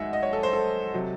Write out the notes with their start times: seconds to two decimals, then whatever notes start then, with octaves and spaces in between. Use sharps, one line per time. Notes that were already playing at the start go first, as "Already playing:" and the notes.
Already playing: F#2 D#3 G#3 D#5 E5 F#5
0.13 D#5
0.23 C#5
0.33 A4
0.43 C5
0.53 A4
0.94 C3 F#3